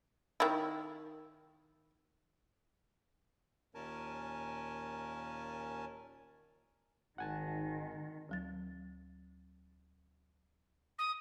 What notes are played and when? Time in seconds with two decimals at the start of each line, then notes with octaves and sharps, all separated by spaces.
0.40 D#3 E4
3.75 D#2 A#2 C#4 A#4 G#5 A5
7.18 G#1 D#3 F#5 G#5 A5
8.29 D2 F#3 A6
10.98 D#6